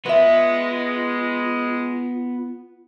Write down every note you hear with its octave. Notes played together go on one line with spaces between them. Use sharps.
G#3 B3 F4 B4 E5